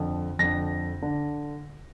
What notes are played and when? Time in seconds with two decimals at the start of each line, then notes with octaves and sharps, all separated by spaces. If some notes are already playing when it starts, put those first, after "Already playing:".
Already playing: F2 D3
0.39 F2 D3 A#6
1.02 D3